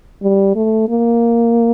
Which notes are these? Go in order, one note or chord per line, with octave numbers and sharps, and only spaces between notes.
G3
A3
A#3